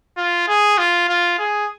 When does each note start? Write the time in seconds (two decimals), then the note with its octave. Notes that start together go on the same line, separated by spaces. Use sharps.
0.17 F4
0.48 G#4
0.78 F4
1.08 F4
1.39 G#4